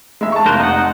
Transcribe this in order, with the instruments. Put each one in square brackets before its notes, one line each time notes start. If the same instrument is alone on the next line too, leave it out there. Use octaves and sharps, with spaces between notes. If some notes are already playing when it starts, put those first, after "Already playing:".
[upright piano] G#3 E5
A5 C#6
[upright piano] F1 F#6 [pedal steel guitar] A#3 A#4 C5
[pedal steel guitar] D#4 F#5